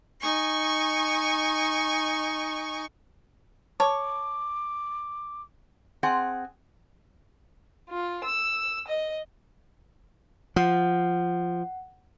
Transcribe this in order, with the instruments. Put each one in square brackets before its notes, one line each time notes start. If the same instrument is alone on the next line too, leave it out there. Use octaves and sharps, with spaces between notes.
[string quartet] D#4 G#5 C#6
[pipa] C#5 [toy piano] A5 [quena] D6
[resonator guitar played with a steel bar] C4 G#4 F#5
[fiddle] F4
E6
D#5
[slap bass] F3 [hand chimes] F#5